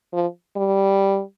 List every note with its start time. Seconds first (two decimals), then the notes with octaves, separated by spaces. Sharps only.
0.13 F3
0.56 G3